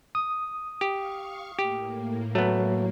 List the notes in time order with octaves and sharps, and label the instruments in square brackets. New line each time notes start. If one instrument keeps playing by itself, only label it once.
[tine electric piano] D#6
[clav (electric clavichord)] G4 [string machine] F5 C#6
[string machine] A2 A#3 [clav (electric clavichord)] G4
[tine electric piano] F#3 [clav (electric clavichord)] A3 B3